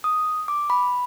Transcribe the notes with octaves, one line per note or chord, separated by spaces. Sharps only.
D#6
D6
B5